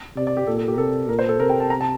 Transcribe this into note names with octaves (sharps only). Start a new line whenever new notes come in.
C3 D5
D5
G4
A#2 A4
A4
G4
A#4
C3 A4
A#2 A#4
C5
A4
C3 A#4
G5
A5
A#5
A5